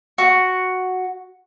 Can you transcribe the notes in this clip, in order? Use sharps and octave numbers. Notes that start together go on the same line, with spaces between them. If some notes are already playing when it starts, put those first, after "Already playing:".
F#4